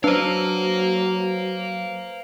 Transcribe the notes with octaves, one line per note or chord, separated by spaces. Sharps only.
F#3 D4 B4 C5 F5 A#5